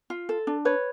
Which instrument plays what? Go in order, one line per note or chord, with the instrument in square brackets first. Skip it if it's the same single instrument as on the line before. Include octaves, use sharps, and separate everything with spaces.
[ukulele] F4
A4
D4
B4 C#5